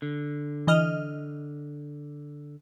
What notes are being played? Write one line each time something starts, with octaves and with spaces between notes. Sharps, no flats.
D3
E3 D#5 F6